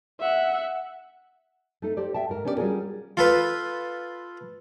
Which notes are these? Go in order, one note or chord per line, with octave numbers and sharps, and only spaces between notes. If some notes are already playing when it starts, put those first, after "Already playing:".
E5 F#5
A3 D#4 A4
G4 C5 D5
E5 G5 A5
G#2 A#4
B3 C#4 D4 G4 A#4 D5
G3 C#4 F4 F#4 G#4 A#4
F4 A4 B4